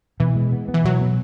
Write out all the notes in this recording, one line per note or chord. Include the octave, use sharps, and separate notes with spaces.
B2 E3
G#3
B3
B3
E3
B2 F#3
B3